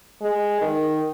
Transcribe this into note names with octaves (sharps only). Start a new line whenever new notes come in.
G#3
D#3